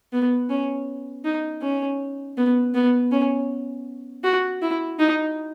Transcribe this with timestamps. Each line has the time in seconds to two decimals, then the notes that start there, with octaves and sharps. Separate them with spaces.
0.13 B3
0.50 C#4
1.25 D#4
1.62 C#4
2.38 B3
2.74 B3
3.12 C#4
4.24 F#4
4.62 E4
5.00 D#4